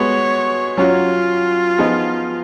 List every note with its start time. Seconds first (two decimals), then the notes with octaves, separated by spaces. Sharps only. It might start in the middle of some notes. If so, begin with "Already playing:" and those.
Already playing: G#3 B3 F#4 C#5
0.77 F#3 C#4 F4 F#4
1.78 F3 B3 D#4 G#4